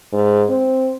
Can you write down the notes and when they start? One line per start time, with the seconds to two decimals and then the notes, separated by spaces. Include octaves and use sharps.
0.13 G#2
0.49 C4